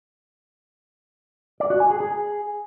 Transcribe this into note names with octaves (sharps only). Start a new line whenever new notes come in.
D5
F#4
G#5
G#4
G#4